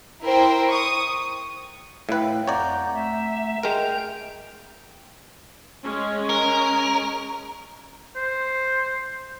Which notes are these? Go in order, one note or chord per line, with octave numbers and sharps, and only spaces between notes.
E4 A#4 C5 G5
C#6 D#6
A2 B4 E5 F5 G5
F2 C#5 D5 F#5 A#5 G6
A3 E5
G#3 A#4 G5 G6 F7
G#3 C#4
A#4
C5